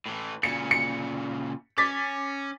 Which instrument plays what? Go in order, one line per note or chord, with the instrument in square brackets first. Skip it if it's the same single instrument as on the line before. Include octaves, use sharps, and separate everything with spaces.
[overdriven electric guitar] A2 E3
[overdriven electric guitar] A#2 C#3 [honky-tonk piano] C#7
[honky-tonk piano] C#7
[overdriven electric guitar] C#4 [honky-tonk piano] D6 A6 B6